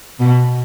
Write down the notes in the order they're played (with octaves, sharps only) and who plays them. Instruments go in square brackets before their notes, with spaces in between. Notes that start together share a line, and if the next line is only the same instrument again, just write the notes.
[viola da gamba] B2